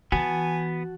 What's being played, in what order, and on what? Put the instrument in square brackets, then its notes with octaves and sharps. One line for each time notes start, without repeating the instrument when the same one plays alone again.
[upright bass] E3 [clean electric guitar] B3 [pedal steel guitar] F#4 A5 [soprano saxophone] G#5